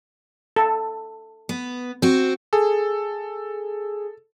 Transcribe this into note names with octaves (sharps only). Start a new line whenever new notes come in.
A4
B3
C4 F#4
G#4 A4